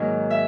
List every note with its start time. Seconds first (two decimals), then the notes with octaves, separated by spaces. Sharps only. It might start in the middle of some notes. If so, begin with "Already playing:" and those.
Already playing: G#2 D#3 F#3 A#3 F#5
0.30 E5